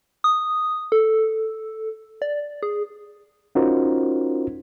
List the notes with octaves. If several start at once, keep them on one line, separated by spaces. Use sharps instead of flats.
D#6
A4
D5
G#4
C#4 D#4 F4 F#4 A#4 C5